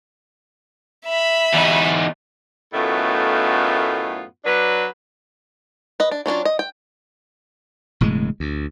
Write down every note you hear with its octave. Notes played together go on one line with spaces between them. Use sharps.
E5 B5
E2 D#4
F#2 A2 D#3 A3 B3 F4
F#3 D4 B4
B4 D#5
D4
F#3 C#4 D4 F4
D#5
G5
E1 A2 C#3 G#3
D2